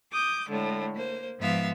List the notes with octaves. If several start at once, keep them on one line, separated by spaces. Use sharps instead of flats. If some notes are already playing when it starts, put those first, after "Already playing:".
D6 D#6 G6
A2 D3 G#3
A#3 C5
G#2 F3 B3 E5 F5